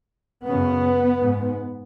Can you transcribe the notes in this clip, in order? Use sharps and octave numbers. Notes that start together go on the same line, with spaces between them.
F#2 C#3 B3
G#2